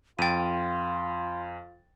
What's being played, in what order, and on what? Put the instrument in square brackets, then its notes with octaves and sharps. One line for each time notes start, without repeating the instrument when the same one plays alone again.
[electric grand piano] F2 A6 [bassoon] F4 [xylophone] G5 D#7 [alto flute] C6